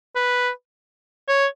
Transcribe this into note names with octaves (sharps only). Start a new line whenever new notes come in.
B4
C#5